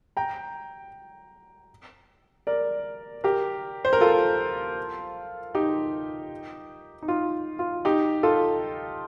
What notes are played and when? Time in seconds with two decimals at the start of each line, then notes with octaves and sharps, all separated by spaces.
0.17 G5 A#5
2.47 A#4 D5
3.24 G4 A#4
3.85 C5
3.93 A#4
4.01 F4 A4
5.55 D#4 G4
7.02 D#4
7.08 F4
7.59 F4
7.85 D#4 G4
8.23 F4 A4